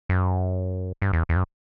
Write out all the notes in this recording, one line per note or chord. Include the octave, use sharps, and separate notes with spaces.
F#2
G2
E2
E2
F#2